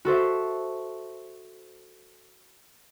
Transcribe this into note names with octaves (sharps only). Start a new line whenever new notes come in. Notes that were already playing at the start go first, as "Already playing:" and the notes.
F#4 A4 C5 E5